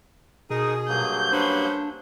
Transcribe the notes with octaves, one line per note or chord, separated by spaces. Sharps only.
B2 D#4 G#4 A#4 D#6
G2 F#3 A#3 G6
C#4 D4 B4 C5